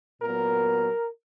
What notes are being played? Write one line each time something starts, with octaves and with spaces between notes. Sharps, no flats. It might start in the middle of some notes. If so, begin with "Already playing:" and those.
A#2 F#3 B3 A#4